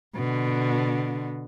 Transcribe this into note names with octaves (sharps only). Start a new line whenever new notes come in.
B2 D3